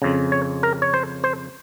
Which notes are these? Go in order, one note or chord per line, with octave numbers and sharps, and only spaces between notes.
F2 C#3
C#5
A#4
C#5
C5
C5